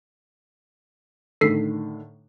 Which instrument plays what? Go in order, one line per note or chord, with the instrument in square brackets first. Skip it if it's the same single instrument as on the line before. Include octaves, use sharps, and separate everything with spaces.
[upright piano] A2 D3 D#3 [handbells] A4 B6 C7